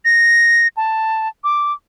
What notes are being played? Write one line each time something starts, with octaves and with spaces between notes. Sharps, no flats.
A#6
A5
D6